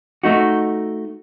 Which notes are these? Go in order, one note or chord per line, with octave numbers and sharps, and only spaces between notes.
A3 D#4 F#4